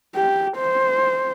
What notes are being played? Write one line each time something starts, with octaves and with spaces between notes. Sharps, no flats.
G4
C5